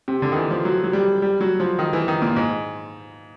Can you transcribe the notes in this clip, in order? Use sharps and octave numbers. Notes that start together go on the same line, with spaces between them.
C3
D3
D#3
E3
F3
F#3
F#3
G3
G3
F#3
F3
D#3
E3
D#3
A#2
G#2